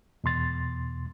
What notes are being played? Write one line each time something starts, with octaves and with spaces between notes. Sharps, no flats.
E2 B2 C6 A6